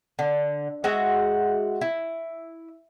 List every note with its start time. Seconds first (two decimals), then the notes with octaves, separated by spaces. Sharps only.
0.19 D3
0.84 G#3 F#4 E5 F#5
1.81 E4